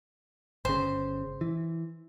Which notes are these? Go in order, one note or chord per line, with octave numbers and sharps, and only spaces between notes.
G1 C#3 C5
E3